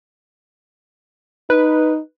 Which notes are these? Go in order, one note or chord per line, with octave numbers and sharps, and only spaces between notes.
D#4 B4